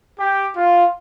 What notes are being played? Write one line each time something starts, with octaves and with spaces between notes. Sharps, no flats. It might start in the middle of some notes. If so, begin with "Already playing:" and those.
G4
F4